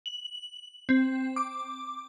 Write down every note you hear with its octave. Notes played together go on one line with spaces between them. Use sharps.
F#7
C4
D6